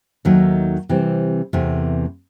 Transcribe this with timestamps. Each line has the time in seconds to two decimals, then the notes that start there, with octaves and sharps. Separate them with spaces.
0.25 D#2 D#3 F#3 A3 D#4
0.89 C3 E3 G3 C4
1.53 E2 C3 E3 A3